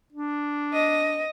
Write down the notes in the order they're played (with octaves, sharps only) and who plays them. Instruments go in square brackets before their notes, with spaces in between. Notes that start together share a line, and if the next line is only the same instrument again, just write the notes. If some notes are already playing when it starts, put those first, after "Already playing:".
[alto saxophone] D4
[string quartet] D#5